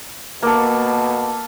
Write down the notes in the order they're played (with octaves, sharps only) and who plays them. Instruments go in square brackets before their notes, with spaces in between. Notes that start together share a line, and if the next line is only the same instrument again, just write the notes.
[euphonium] B2 [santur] A#3 A4